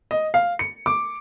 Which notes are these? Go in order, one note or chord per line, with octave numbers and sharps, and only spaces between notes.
D#5
F5
C#7
D6